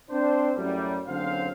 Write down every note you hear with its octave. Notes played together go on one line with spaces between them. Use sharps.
C4 D4 C5
F#2 A2 G3
F#1 D3 F#3 C4 C5 F5